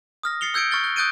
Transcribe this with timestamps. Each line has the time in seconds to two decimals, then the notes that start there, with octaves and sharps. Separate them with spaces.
0.23 D#6 F6 A#6
0.41 A6 C7 C#7 F7 G7
0.54 E6 G6 G#6 C#7 D7
0.71 C#6 F6 A6 G7
0.84 F#6
0.96 D#6 F#6 G6 A6 D7 D#7